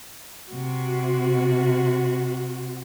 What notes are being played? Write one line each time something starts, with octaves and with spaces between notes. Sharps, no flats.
C3 F#4